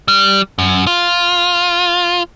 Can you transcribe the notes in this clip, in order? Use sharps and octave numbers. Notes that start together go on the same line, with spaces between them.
G3
F#2
F4